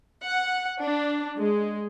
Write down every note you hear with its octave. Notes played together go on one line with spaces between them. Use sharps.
F#5
D4
G#3